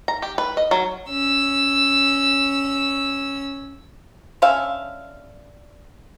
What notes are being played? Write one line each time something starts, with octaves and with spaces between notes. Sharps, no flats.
A#5
G4
B4
D#5
F#3
C#4 E6
D3 C#4 E5 F5